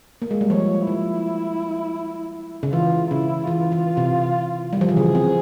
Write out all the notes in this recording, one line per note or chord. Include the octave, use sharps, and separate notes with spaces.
A#3
G#3
G3
F3 C#5
F3 E4
C#3
E3 F4
C#3 E4
E3 F4
E3
C3
G3
F3
E3
C#3 G#4
C4